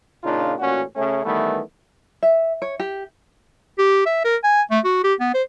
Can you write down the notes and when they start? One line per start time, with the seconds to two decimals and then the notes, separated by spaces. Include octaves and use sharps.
0.24 A#2 C#3 D4 D#4 F4
0.59 A1 A#2 C#4 F#4
0.96 C#3 A3 C#4
1.24 D#3 E3 G3 A3 B3
2.23 E5
2.62 C#5
2.80 G4
3.78 G4
4.06 E5
4.25 A#4
4.44 G#5
4.71 A3
4.85 F#4
5.04 G4
5.20 B3
5.34 C5